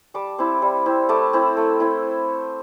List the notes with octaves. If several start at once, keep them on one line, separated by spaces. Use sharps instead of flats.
G3 A5 D6
C4 E4
G3
C4 E4
A3 A5 D6
C4 E4
A3
C4 E4